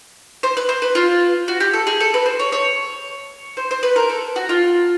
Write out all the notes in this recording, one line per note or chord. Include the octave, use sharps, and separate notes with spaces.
C5
B4
C5
B4
F4
F#4
G4
A4
G#4
A4
B4
C5
C#5
C#5
C5
C5
B4
A#4
A4
F#4
F4